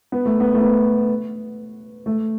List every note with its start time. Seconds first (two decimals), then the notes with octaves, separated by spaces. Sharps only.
0.12 B3
0.25 A3
0.40 B3
0.54 A3
0.61 B3
2.06 A3